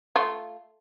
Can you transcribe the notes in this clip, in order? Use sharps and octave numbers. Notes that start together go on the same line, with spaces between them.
A3 F4